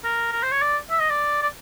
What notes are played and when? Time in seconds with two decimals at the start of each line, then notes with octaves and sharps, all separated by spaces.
0.04 A#4
0.32 A#4
0.43 C5
0.51 C#5
0.62 D5
0.90 E5
0.99 D#5
1.09 D5
1.42 D5